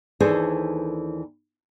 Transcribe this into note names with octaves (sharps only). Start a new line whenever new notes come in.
D#2 E3 D4 G#4 A4 C5